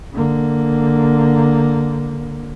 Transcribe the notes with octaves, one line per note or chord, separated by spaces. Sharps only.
D3 A#3